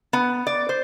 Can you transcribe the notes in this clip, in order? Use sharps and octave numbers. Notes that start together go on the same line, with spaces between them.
B3
D5
C5